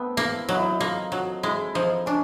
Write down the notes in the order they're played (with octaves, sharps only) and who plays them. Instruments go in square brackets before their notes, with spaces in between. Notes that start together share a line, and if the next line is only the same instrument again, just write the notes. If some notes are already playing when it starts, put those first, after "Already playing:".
Already playing: [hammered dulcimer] A3 C4 [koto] B3
[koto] A#3 [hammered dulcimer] E4
[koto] F#3 [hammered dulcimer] D#4
[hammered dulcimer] E4
D#4
[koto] A#3 [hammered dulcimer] F4
[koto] F#3
[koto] G#3 [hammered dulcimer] E4
[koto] F3 [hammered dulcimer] D#4
[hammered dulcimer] C#4 [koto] D4